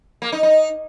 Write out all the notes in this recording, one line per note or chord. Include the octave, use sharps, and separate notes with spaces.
A#3
D#4
D#4